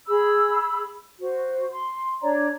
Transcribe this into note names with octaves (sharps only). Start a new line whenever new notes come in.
G#4 B5 E6
F#4 C5
C6
D4 C#5 D5 A#5